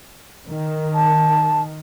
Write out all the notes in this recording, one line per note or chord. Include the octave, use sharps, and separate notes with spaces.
D#3
A5